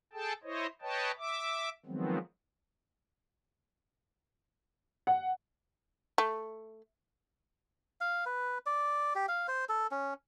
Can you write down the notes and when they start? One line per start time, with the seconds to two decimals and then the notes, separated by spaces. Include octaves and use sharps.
0.13 G#4 A4 G5 A5
0.43 E4 C5 C#5 D#5
0.82 B4 C#5 D#5 G5 A5
1.18 E5 D6
1.86 D#3 F3 F#3 G#3 B3 C4
5.07 F#5
6.18 A3
8.01 F5
8.26 B4
8.66 D5
9.15 G4
9.28 F5
9.48 C5
9.69 A4
9.91 C#4